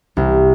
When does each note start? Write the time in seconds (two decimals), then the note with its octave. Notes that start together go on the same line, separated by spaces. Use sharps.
0.17 C2